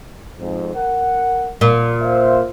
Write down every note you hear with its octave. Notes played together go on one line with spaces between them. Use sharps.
F2 G#2
A#4 F#5
A#2
C5 E5 F5